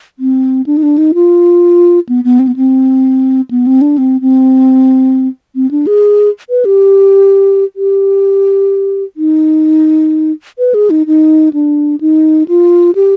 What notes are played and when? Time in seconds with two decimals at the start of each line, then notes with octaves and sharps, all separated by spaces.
0.19 C4
0.66 D4
0.77 D#4
0.83 D4
0.98 D#4
1.14 F4
2.09 B3
2.24 B3
2.39 C4
2.47 B3
2.56 C4
3.51 B3
3.67 C4
3.81 D4
3.98 C4
4.21 C4
5.55 C4
5.71 D4
5.87 G#4
6.50 B4
6.65 G4
7.76 G4
9.17 D#4
10.59 B4
10.74 G#4
10.90 D#4
11.07 D#4
11.53 D4
12.01 D#4
12.48 F4
12.95 G4